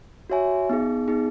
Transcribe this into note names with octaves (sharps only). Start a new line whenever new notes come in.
F#4 C#5 E5 G#5
B3 D#4 G#4
B3 D#4 G#4